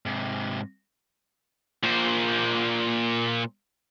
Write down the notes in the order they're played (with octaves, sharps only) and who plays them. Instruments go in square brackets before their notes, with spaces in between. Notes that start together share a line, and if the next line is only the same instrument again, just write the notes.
[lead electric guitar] G#2 C3
[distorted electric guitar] A#2 C5